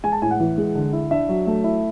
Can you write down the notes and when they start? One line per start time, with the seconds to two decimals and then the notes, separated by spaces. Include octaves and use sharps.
0.04 G#3 G#5
0.12 A5
0.22 A2 G#5
0.31 F#5
0.39 E3
0.58 G#3
0.75 D3
0.93 E4
1.11 D4 E5
1.29 F#3
1.47 A3
1.64 E4